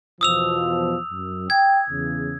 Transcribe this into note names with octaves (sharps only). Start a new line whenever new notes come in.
E2 B2 F3 D#6 E6 F7
F#2
G5 G#6
E2 C#3